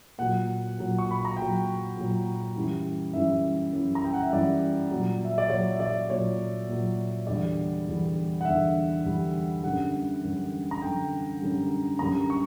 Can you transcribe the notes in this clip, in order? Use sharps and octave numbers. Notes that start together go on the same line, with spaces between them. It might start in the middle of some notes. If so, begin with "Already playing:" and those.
A#2 F#3 F#5
A#2 F#3
C#6
B5
A#5
A#2 F#3 G5
A#2 F#3
F#2 E3 G3
F#2 E3 G3 E5
F#2 E3 G3
A#5
G5
F#5
E5
F#2 E3 G3 D5
A#2 F#3
E5
D5
A#2 F#3 C#5
E5
D5
A#2 F#3 C#5
A#2 F#3
E2 D3 G3 D5
E2 D3 G3
F#5
E2 D3 G3 E5
E2 D3 G3
F#2 D3 G3 F#5
F#2 D3 G3
A#5
F#2 D3 G3 G5
F#2 D3 G3
F#2 D3 G3 A#5
C#6